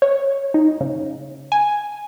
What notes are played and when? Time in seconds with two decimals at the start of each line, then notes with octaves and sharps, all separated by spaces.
0.02 C#5
0.54 D#4
0.81 C#3
1.52 G#5